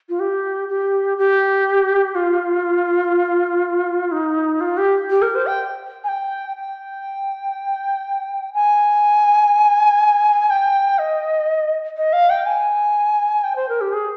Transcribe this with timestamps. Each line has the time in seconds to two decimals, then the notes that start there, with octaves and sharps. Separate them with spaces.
0.09 F4
0.20 G4
0.69 G4
1.18 G4
2.15 F4
4.12 D#4
4.61 F4
4.78 G4
5.10 G4
5.22 A#4
5.35 C5
5.47 G5
6.04 G#5
6.08 G5
6.57 G5
8.54 G#5
10.50 G5
10.99 D#5
11.97 D#5
12.13 F5
12.30 G5
12.46 G#5
13.44 G5
13.56 C5
13.69 A#4
13.81 G4
13.93 G#4